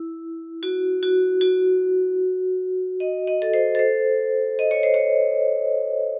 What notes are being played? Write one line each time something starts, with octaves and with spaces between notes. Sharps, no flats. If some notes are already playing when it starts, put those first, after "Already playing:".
Already playing: E4
F#4
F#4
F#4
D#5
D#5
A4
C5
A4
C5
D#5
C#5
C5
C#5